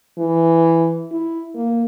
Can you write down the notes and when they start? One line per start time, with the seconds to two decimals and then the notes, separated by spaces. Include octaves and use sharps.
0.18 E3
1.12 E4
1.55 A#3